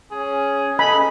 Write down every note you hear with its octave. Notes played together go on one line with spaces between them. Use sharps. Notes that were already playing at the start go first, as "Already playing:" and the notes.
C#4 G#4
A4 D#5 G#5 B5